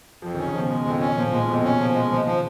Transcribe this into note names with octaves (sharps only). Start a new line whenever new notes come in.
F2 F3
D#3
C#4
C#3
B2 F3
G#3
F2
C#4
A#2 F3
A#2 G#3
F2 B2
C#3 C#4
F3
G#3
D#3 F3
F3